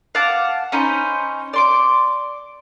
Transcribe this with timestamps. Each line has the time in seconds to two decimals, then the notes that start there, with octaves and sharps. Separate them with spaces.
0.15 F5 F#5 A5 D6
0.72 C#4 D#4 C5 B5
1.53 D5 C6 D6